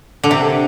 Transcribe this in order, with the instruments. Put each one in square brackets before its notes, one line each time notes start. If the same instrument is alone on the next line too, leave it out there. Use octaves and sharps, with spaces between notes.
[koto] D3
C3